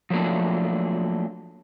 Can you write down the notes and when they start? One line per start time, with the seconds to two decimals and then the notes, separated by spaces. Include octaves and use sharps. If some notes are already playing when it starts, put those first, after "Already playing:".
0.10 F3 F#3 A3 A#3 D4